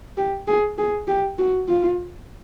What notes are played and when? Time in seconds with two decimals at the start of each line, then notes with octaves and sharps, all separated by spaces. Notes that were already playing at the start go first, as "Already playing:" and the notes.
0.17 G4
0.48 G#4
0.78 G#4
1.08 G4
1.39 F#4
1.68 F4